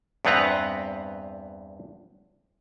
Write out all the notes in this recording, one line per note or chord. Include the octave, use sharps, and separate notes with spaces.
E2 G2 B3 C4 B4 A#5